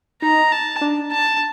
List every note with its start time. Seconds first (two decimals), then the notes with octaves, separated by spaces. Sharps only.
0.22 D#4 A#5
0.52 A5
0.81 D4
1.11 A5